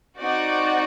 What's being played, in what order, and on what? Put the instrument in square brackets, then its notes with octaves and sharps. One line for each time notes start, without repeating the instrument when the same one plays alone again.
[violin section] C4 D#4 F#4 D5